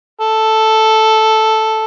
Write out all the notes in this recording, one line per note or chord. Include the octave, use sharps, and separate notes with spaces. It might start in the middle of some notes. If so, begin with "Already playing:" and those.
A4